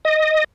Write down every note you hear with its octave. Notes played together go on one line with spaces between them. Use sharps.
D#5